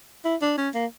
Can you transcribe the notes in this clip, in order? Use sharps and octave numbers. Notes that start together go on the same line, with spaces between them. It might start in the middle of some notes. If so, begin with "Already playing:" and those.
E4
D4
C#4
A#3